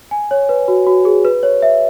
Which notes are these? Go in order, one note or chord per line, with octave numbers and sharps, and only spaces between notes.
G#5
C#5
B4
F#4
F#4
G#4
B4
C#5
E5